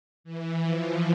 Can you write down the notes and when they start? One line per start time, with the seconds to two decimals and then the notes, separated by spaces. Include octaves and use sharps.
0.24 E3
0.63 F3